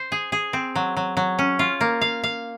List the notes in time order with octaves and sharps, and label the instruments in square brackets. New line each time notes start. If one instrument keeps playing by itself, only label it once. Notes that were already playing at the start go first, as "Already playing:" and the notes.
Already playing: [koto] C5
G#4
G#4
C4
F#3
F#3
F#3
C#4
F4
A#3
F5
F5